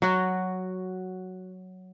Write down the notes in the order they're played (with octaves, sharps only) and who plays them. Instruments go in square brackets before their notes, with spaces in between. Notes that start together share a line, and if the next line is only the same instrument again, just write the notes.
[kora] F#3 F#4